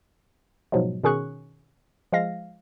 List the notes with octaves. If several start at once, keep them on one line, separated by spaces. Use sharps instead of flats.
G#2 B2 F3 F#3 G#3
B2 D#3 C#4 G#4 C#6 F#6
F3 G#3 F5 A#6